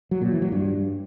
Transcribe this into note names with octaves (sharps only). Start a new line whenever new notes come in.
F#3
A#2
E3
F#3
G2